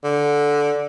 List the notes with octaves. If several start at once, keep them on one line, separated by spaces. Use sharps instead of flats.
D3